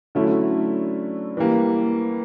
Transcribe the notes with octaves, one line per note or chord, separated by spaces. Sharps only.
D3 F#3 A3 C#4 E4
E3 G3 A#3